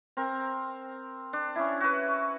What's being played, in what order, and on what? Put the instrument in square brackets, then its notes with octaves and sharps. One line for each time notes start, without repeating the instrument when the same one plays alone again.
[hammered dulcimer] C4 A#4
D4
C#4 E4
F#4 B4